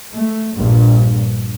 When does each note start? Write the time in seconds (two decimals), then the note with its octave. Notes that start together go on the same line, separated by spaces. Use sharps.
0.13 A3
0.56 A#1 G2